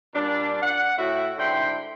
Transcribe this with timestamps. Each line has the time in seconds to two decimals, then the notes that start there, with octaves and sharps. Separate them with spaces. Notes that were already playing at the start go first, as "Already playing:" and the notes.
0.14 A#2 G3 D4
0.62 F#5
0.97 A2 E4 F#4
1.38 G#2 D3 E4 G5 C6